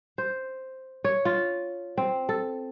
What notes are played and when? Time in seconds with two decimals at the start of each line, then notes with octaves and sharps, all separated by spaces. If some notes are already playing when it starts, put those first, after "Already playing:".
0.18 C5
1.04 C#5
1.25 F4
1.98 C4
2.29 A4